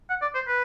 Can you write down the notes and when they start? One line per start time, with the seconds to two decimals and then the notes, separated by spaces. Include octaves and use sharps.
0.09 F#5
0.22 D5
0.35 C5
0.47 B4